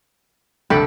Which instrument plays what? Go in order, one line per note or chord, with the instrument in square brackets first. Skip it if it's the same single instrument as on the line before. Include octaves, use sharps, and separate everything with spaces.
[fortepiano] C2 D3 [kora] A4 [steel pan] G5 B5